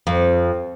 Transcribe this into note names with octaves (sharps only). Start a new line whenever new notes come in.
F2